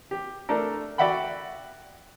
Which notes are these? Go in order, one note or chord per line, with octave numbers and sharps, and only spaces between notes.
G4
A3 D4 A4 A#4
F#4 D5 E5 F#5 G5 B5